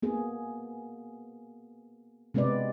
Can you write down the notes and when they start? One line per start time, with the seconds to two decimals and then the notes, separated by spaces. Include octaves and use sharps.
0.02 A#3 B3 G#4
2.34 C3 G#3 B3 C4 B4 D5